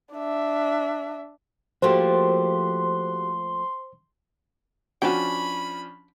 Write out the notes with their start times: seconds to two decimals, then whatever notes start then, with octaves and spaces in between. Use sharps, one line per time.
0.14 D4 E5
1.82 F3 A3 A#3 F#4 G4 C5 C6
5.02 F3 C#4 D4 F#4 G5 B5